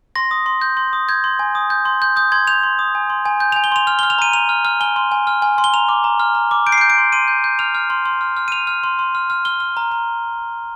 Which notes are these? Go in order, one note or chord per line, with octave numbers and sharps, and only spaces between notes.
C6 A#6
D#6
C6
G6
C6
D#6
G6 G#6
C6
G#5
D#6
G6
C6
C6 G6
D#6 G6
C6 G#6
G6 F7
C6
D#6
G#5
C6
G#5
G6
G#5 F7
G7
C6 F7
F6 F7
F6 G7
F7
A#5 D#7
A#5 F7
F6
F6
G#5 G7
C6
G#5
F6
G#5
C6
G7
A#5 F7
D6
A#5
F6
A#5
D6
G6 D7
C7
D7
G6
D7
C6
C6 D#7
G6
G6
F6 F7
F6
C6
C6
F6
F6
D#7
F6 F7
F6
C6
C6
F6
F6
F6 G7
F6
A#5
A#5